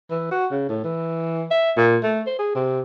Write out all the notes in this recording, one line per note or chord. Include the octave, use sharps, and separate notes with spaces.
E3
F#4
C#3
A2
E3
E5
A#2
A3
C5
G#4
C3